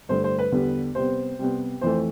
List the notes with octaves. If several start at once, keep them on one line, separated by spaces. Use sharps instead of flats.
G2 D3 A3 C5
C5
B4
E2 D3 G3 B3
C3 G3 B3 C5
C3 G3 B3
F2 E3 A3 C5